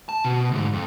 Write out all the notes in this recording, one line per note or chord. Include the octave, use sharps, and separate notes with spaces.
A5
B2
D2 G#2
F2